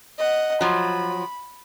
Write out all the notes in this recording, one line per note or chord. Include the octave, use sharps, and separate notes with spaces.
D#5 F#5
F3 F#3 B5